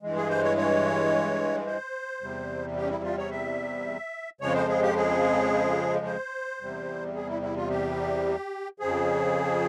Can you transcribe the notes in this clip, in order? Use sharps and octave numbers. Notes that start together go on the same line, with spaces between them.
G2 E3 G#3
G#4
C5
C#5
C#5
C5
E2 C3 G3
G4
C#4
E4
F4
C#5
E5
F2 C#3 F3 G#3 C#5
C5
G#4
G4
G#4
C5
E2 C3 G3
G#4
E4
E4
F4
G4
F2 C#3 F3 G#4